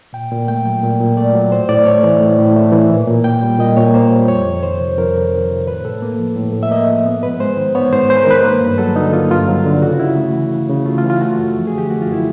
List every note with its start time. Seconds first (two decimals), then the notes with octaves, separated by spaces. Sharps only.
0.13 A#2 G5
0.31 A#2
0.48 A3 G5
0.65 F#3
0.83 A#2
1.00 A#2
1.17 A3 D5
1.35 F#3
1.52 A2 C5
1.69 A2 D5
1.86 A3 C#5
2.03 E3
2.21 A2
2.39 A2
2.56 A3
2.72 E3
2.90 A#2
3.08 A#2
3.24 A#3 G5
3.43 G3
3.59 A#2 D#5
3.77 A#2 C#5
3.94 A#3 C5
4.11 G3
4.28 F2 C#5
4.47 F2
4.63 D#3 C5
4.80 C3
4.98 F2 A#4
5.15 F2
5.33 D#3
5.50 C3
5.67 A2 B4
5.84 A2 A4
6.02 A#3
6.19 F3
6.36 A2
6.53 A2
6.63 E5
6.71 A#3 D#5
6.88 F3
7.06 B3
7.23 G#2 B4
7.40 G#3 C5
7.57 D#3
7.75 B3 C#5
7.92 G#2 C5
8.09 G#3 C5
8.17 B4
8.23 A#4
8.27 D#3 B4
8.43 A#3
8.61 G2
8.78 F#3 A4
8.96 D3 D#4
9.13 A#3 F4
9.31 G2 F4
9.48 F#3
9.66 D3
9.82 C#3 F#4
9.99 C#3 E4
10.17 A3
10.34 E3
10.52 C#3
10.70 C#3
10.86 A3 F4
10.98 F4
11.03 E3
11.10 F4
11.21 A3 F#4
11.38 F#2
11.56 F3
11.67 G#4
11.73 D3
11.78 G4
11.90 A3 F#4
12.02 F4
12.07 F#2
12.13 E4